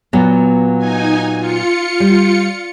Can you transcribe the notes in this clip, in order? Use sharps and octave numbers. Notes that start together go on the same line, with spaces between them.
A#2 F#3 B3
D#4 G#5
F4 C#7
G3